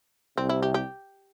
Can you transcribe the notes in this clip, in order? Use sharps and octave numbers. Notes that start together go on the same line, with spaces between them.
C2 C3 C4
E4
G4
G4